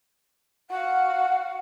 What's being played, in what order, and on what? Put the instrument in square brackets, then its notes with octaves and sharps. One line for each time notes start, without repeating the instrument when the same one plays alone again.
[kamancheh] F#4 F5 [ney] F#5